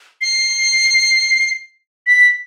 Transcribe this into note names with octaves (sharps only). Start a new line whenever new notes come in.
C7
B6